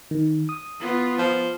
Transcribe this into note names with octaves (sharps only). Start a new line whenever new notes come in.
D#3
D#6
B3 F4
F3